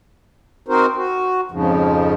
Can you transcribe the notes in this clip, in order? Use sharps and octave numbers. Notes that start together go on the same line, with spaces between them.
C4 D#4 F#4 A#4 C5
F#4
F2 G#2 C#3 F3